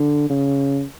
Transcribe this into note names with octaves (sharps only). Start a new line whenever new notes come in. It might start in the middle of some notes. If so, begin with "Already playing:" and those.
Already playing: D3
C#3